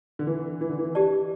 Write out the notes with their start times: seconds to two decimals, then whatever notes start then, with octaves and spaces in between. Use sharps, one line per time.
0.19 D3
0.27 E3
0.61 E3
0.69 D3
0.79 E3
0.95 G4 D5 A5